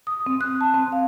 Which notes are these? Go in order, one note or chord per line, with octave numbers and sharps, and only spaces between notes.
D#6
C4
F#6
A5
C4
F5